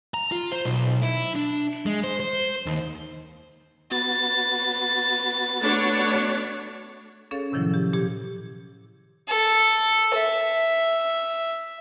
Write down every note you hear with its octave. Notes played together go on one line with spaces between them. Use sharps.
A#5
F4
C5
B1
E4
D4
G#3
C5
C5
D#2
B3 F#4 A6
A3 D4 C#5
C#4 G#4 A4 C#5 F5 A6
A2 C3 D#3 F3 F#3 E4
G4
A#2 G4 G#6
A4
E5